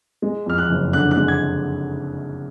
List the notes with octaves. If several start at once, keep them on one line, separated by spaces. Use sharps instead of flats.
G#3
F2 F6
F#6
F#1
D3 F#6
F#6
G#3
G#6